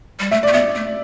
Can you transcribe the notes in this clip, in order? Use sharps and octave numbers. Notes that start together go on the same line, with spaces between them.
G3
A3 E5
A3 D5
B3 E5
A3